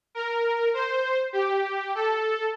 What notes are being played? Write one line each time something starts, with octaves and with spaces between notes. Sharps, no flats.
A#4
C5
G4
A4